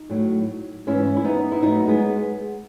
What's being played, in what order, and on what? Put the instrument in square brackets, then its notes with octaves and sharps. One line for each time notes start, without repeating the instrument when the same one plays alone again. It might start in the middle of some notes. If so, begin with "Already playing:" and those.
Already playing: [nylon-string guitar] D#4
A2 F#3
G#2 E3 C#4 E4
E4
B3 D#4
E4
A2 F#3 B3 D#4
G#3 B3